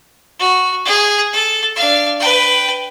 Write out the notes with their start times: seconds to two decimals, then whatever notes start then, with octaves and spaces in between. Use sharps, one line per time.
0.39 F#4
0.86 G#4
1.33 A4
1.76 D4 F5
2.20 B4 G5